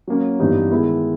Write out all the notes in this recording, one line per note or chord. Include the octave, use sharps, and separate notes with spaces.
F#3 A#3 C#4
G2 E3 G3 B3 D#4
D#3 G#3 B3 E4